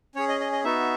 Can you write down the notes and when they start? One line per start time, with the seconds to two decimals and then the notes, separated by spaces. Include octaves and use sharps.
0.15 C#4 G#4 C#5
0.28 D#5
0.40 D#5
0.52 D#5
0.64 B3 D#4 F#4 E5